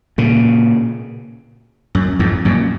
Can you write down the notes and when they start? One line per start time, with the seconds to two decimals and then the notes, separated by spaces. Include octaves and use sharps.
0.18 A#2 C#3
1.95 F#2
2.19 F2 G#2
2.45 F#2 A#2